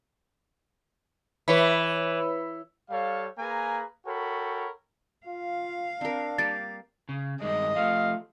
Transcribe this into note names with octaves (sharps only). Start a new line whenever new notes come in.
E3 B4 C#5 B5
G3 A4 C#5 F5
A#3 G#4 B4 G#5 A#5
F#4 A4 A#4 C#5 G5 B5
F4 F5
C4 D4 A#4
G3 A#3 G4 A6
C#3
G2 D#3 G#3 D#5
F3 A3 F5